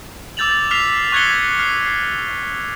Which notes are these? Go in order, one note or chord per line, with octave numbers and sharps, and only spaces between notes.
D6 E6 G6 A6 F7 F#7
D6 F6 B6 C7 F7
C#6 F#6 G#6 C7 C#7 G7
F6 C7